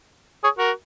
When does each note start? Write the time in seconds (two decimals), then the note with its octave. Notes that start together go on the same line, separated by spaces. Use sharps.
0.44 G#4 C#5
0.58 F#4 A#4